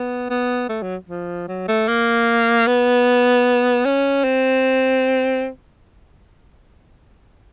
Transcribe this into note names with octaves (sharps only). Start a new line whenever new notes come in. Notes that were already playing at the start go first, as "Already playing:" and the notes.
Already playing: B3
B3
A3
F#3
F3
F#3
A3
A#3
B3
C#4
C4